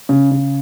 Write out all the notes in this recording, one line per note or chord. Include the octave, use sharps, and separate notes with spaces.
C#3
C#3